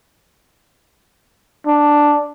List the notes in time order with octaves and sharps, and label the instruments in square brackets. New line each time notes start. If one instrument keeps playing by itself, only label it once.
[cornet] D4